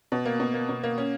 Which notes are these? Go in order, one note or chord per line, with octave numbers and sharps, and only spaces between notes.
B2
A#3
B2
A#3
B2
A#3
C#4